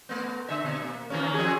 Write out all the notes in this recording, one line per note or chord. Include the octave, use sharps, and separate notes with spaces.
A3 B3
D3 E5
B2
A#3
D#3 A#3 C#4
F3 C#4 G#4